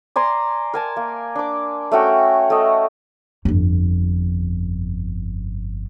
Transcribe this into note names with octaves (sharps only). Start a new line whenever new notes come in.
D5 G#5 A#5 C6
A#4 G#5 A5
A#3
D4 D6
A3 C#4 F#4 G5
A3 D#5
G1 F2